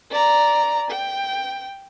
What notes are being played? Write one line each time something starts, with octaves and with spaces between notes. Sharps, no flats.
D5 A#5
G5